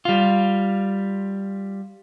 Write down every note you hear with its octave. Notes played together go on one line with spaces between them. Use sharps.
G3 F4